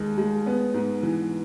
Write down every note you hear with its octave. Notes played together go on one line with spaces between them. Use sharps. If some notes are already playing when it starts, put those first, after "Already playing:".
Already playing: D#2 G#3
G#3
B3
G#2
E3